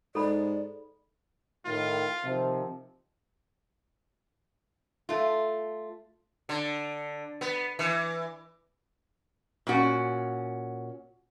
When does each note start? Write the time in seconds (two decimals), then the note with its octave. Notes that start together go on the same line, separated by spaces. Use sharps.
0.15 G#2 A4 D5 B5
1.65 A2 D#3 F4
2.23 C3 D#3 F3
5.09 A3 F4
6.49 D3
7.41 B3
7.79 E3
9.67 A#2 C#4 F#4 F#5